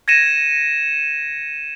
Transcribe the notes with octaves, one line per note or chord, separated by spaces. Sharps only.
G#6 A#6 C#7 D#7 E7